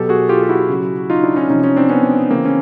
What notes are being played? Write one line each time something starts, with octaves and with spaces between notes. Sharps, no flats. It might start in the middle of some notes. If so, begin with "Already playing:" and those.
Already playing: B2 F#3 G4 A4
F#4 G#4
F4 G4
G4
E4 F#4
C#3 F#3
D#4 F4
D4 E4
C#4 D#4
C3 F3 C#4 D#4
C#4 D#4
C4 D4
B3 C#4
C#3 E3 A#3 C4
C#4